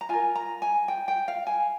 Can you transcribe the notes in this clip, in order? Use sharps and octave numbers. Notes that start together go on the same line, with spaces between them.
A#5
F4 A#4 G#5
A#5
G#5
G5
G5
F5
G#5